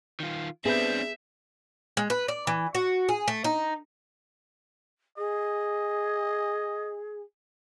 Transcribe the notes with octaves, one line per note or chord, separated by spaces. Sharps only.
D#3 F4
B3 C4 D4 G#4 B4 E5 G6
G#3
B4
D5
E3
F#4
G#4
A3
D#4
G#4 D#5